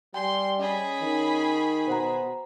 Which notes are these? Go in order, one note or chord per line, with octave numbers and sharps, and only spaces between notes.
G3 G5 G#5 C6
C#4 G#4 D#5 B5
D#3
B2 C5 F#5 A#5